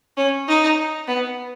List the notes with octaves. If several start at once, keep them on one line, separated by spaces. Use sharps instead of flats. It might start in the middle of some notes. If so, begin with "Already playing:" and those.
C#4
D#4
B3